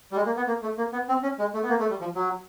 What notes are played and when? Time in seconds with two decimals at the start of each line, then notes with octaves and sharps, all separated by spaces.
0.12 G3
0.16 G#3
0.26 A#3
0.37 B3
0.47 A#3
0.62 A3
0.78 A#3
0.93 B3
1.09 C4
1.23 C#4
1.39 G#3
1.54 A3
1.63 B3
1.69 A#3
1.80 A3
1.90 G3
2.00 F3
2.15 F#3